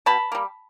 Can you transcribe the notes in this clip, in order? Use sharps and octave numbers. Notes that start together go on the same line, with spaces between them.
B2 A5 B5
G3 A#3